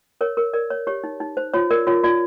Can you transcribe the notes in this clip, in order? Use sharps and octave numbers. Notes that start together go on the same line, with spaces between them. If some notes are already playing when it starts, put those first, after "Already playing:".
A#4 C#5
A#4
A#4 D5
C#5
G4 C#5
D#4
D#4
C5
F4 C#5
A#4 D5
F4 C#5
F4 D5